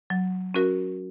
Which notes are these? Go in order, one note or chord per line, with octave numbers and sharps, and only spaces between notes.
F#3
C#4 F#4 A#4